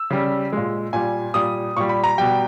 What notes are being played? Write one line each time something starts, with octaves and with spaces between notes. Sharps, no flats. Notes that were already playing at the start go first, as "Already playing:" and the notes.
Already playing: E6
C#3 G3
A#2 G#3
A#2 G3 G#5
A#2 G3 D#6
A#2 G3 C#6
B5
A#5
B2 G3 G5